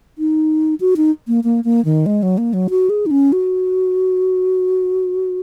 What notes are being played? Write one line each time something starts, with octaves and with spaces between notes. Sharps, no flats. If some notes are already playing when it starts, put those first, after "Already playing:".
D#4
F#4
D#4
A#3
A#3
A#3
D#3
G#3
F#3
A#3
F#3
F#4
G#4
D#4
C#4
F#4